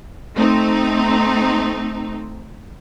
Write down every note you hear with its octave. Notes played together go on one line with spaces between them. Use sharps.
A3 C4 D#4